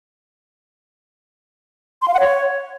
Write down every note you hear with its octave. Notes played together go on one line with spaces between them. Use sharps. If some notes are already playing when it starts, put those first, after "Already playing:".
C6
F5
F#5
C#5